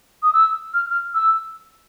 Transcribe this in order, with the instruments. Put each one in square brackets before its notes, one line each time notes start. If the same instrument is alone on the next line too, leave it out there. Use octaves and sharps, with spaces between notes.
[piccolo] D#6
E6
F6
F6
E6